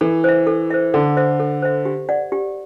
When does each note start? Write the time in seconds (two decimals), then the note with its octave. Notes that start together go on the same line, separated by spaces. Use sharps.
0.01 E3 A4
0.24 C5 E5
0.47 A4
0.70 C5 E5
0.94 D3 A4
1.17 C5 E5
1.40 A4
1.62 C5 E5
1.85 G4
2.09 D5 F#5
2.32 G4